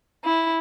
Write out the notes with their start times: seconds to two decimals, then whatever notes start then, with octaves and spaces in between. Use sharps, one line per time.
0.24 E4